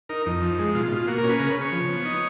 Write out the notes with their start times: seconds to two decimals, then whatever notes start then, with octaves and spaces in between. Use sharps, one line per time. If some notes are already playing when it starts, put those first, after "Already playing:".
0.09 D#4 A#4
0.26 F2 D#4
0.42 F3
0.59 G#3
0.75 B2 F4
0.86 F4
0.92 B2
0.97 F4
1.08 A#3 F#4
1.18 A#4
1.24 C#4
1.29 B4
1.39 C#3 A#4
1.51 B4
1.55 C#3
1.61 C#5
1.72 F3
1.89 B3
2.05 D#4